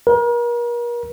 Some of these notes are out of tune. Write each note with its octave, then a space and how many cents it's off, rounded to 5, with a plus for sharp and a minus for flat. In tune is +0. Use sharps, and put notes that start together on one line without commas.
A#4 +40